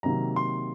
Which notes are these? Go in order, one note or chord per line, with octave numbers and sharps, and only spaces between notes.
C3 D#3 F#3 A#3 A#5
C6